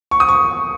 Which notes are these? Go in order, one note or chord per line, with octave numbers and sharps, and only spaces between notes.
C#6
D#6
C#6